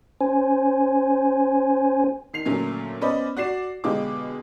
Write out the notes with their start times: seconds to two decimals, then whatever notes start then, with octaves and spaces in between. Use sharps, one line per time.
0.21 C#4 C5 G#5
2.33 D#3 C7 F7
2.45 A#2 D3 F#3 A3 C#4
3.01 B3 C#4 C5 D5 D#5 B5
3.37 F#4 D5 C7 E7
3.84 B2 D3 G#3 F4 G4 D6